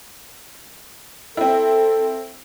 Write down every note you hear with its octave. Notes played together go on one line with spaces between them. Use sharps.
C4 E4 A4